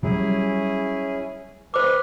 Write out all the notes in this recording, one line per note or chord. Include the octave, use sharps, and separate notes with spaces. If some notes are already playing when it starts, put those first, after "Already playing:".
F#3 G3 C#4 E4 G#4
B4 C5 D6 F6